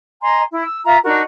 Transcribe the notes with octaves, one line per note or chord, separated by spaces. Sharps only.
D#5 G#5 A#5 C6
E4
E6
F4 E5 A#5
D4 D#4 F#4 A#4